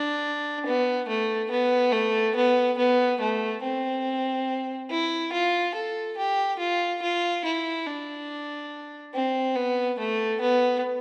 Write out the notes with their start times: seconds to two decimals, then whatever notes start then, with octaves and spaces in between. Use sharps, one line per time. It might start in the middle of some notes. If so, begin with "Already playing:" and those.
Already playing: D4
0.66 B3
1.08 A3
1.51 B3
1.93 A3
2.36 B3
2.78 B3
3.20 A3
3.62 C4
4.90 E4
5.32 F4
5.75 A4
6.17 G4
6.59 F4
7.02 F4
7.45 E4
7.86 D4
9.14 C4
9.56 B3
9.98 A3
10.41 B3